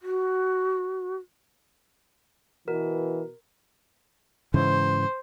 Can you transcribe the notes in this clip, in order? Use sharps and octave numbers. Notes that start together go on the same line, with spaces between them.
F#4
B2 E3 A#4
G#2 C#3 E3 C5